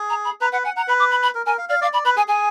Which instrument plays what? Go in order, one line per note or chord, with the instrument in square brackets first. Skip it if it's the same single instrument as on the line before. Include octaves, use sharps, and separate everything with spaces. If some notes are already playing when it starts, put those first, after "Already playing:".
Already playing: [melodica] G#4
[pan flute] A#5
B5
[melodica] B4 [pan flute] A#5
[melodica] B4 [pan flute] F#5
[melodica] F#5 [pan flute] G#5
[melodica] F#5 [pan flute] A#5
[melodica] B4 [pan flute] B5
[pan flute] D6
B5
B5
[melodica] A#4
[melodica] A#4 [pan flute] G#5
[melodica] F5
[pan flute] D5 [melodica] F5
[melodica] D5 [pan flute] F5
[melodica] D5 [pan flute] B5
[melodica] B4 [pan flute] B5
[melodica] G#4 [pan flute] G#5
[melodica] G#4 [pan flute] G#5